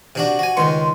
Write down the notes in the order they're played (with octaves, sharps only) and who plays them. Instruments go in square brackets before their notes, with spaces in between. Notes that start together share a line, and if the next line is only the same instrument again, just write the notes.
[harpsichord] C3 D4 F#4
F#4 G#5
[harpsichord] C#2 D#3 C#6 [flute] C6